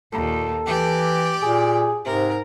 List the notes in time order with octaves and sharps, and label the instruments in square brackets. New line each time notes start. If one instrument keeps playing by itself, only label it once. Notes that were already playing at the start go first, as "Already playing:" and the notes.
[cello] D#2 [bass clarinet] A#2 [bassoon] A4
[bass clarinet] E3 [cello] G4 D5
[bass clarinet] A#2 [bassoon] G#4
[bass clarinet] G#2 [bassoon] C3 [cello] A#4